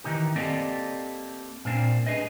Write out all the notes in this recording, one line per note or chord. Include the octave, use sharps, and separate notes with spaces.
D#3 E3 D#4 G4
A#3 C4 G4 A4 D5 D#5
A#2 A#3 C4 D4
D4 G#4 B4 D#5